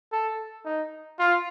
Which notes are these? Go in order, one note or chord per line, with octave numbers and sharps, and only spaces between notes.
A4
D#4
F4